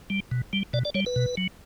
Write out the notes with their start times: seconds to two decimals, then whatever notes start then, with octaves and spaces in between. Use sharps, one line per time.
0.10 G3
0.31 B2
0.53 G3
0.73 B2 D5
0.85 D5
0.95 G3 C#5
1.06 B4
1.16 B2
1.37 F#3